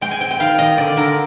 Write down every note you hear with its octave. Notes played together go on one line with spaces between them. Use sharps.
G#3 G5
G#5
C4 G5
G5
D#3 F5
D#3 D#5
D3 D5
D3 A#4